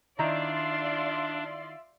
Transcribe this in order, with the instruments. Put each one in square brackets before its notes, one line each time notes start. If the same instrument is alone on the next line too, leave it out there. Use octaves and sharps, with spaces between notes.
[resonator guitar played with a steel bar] D#3 E4 A#5 [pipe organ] D4 [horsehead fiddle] F4 E5 [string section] D5 C6